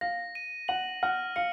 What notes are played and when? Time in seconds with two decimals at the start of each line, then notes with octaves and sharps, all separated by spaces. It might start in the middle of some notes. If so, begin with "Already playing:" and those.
0.01 F5 A#6
0.35 D#7
0.68 F#5 F#7
1.03 F#5 F6
1.36 F5 C#7